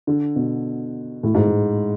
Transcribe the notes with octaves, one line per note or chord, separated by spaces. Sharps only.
D3
B2
A2
G#2
A2